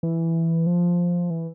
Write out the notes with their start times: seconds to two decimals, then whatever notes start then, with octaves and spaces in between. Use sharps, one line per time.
0.03 E3
0.67 F3
1.30 E3